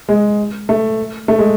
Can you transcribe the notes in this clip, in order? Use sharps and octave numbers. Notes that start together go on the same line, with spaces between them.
G#3
A3
A3
G#3